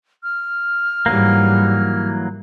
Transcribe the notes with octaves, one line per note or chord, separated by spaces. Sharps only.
F6
G#2 E3 F#3 G3 A#3